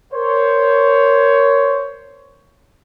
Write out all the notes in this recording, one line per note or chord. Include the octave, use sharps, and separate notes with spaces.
A#4 C5 C#5